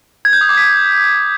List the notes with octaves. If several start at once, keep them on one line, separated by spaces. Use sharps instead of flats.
G#6
G6
D#6
D6
B6